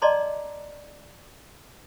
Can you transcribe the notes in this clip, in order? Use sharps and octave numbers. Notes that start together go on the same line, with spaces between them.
D5 D#5 A5 A#5 C6 D6